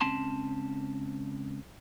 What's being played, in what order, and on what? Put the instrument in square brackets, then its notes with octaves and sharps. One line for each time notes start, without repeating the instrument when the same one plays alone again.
[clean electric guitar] C#2 C4 C#4 A5 C6